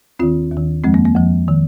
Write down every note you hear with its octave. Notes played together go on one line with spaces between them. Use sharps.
D#2 D#3 C4 F4
D#2 D#3
F2 F3 G#3 C4
A#3
A#3
F2 F3
D#3